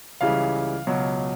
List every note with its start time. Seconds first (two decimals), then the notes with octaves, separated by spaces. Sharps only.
0.21 C#2 C#3 E3 G3 F5
0.87 C#2 B2 F#3